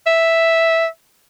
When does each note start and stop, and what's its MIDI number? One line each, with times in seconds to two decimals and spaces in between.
0.07 0.86 76